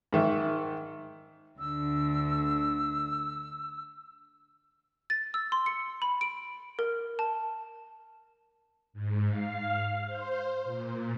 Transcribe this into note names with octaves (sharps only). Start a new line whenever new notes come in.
G#2 D#3 E5
D2 D3 E6
A6
E6
C6
C#7
B5
D7
A#4
A5
G#2
F5
C5
A#2